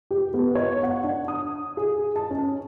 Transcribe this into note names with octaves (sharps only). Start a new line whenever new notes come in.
G4
B3
C#5
F#5
D4
D#6
G#4
A5
C#4